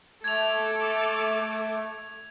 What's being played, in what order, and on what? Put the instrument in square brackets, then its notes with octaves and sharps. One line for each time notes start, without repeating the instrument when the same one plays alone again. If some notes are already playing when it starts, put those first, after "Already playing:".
[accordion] A3 [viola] A4 D6 [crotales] G#6 F7